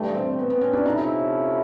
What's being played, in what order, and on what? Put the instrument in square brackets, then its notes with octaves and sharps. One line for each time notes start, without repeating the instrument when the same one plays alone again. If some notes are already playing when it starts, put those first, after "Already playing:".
Already playing: [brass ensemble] G2 E3 G3 [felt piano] A3
[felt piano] C4
B3
B3
C#4
D4
[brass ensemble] C3 F3 A3 C#4 E4 [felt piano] D#4